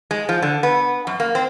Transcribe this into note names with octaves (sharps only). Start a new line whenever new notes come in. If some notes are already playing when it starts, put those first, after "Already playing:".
G#3
F3
D3
B3
F#2
A#3
C4